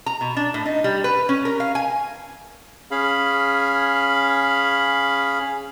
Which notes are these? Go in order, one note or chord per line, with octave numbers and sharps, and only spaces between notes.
A#5
B2
D4
A2
D#4
G3
B4
C#4
A#4
F5
G#5
C#4 G#4 F5 B5